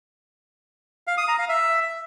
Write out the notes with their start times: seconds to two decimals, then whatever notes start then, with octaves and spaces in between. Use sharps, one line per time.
1.07 F5
1.18 D#6
1.28 A#5
1.39 F5
1.49 E5